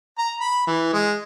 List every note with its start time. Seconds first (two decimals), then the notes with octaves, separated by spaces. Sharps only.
0.18 A#5
0.40 B5
0.67 E3
0.93 G#3